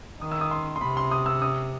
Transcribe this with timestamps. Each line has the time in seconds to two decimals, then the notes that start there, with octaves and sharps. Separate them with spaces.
0.21 D#3 D#6
0.31 E6
0.41 D#6
0.51 C6
0.76 C6
0.81 C3 B5
0.97 C6
1.11 D#6
1.26 E6
1.42 D#6